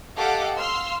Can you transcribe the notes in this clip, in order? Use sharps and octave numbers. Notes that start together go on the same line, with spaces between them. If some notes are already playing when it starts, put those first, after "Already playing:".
G4 A4 D#5 F5 F#5 D6
F5 C6 E6 F6